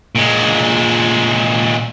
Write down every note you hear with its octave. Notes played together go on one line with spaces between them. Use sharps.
A#2 G#3